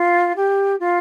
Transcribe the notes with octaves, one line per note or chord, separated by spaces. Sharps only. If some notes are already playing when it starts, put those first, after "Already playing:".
Already playing: F4
G4
F4